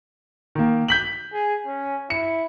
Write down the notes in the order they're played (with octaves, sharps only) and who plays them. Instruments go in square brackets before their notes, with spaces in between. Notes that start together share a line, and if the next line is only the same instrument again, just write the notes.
[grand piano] D#3 A#3
G6 B6 F#7
[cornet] G#4
C#4
[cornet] E4 [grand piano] C#7